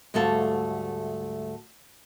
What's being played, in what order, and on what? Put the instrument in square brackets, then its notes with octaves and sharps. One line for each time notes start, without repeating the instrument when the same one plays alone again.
[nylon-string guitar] D2 G#2 G3 A3 A4 F5